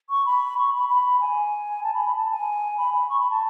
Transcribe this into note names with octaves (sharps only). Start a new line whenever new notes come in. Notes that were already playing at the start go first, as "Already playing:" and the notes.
C#6
B5
C#6
B5
B5
G#5
A5
B5
B5
A5
G#5
B5
B5
C#6
B5
A5